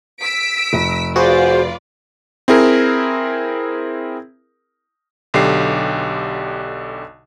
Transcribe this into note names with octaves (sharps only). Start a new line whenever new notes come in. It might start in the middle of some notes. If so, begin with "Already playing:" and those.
E6 B6 D7
F1
F4 F#4 G#4 B4 C5 D5
C4 E4 G#4 A#4
B1 D3 G4 C7